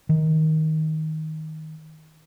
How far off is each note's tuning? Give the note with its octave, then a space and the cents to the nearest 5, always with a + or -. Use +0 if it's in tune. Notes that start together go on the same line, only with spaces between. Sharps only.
D#3 +15